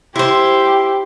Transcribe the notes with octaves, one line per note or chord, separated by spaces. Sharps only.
E4 G4 C5 C6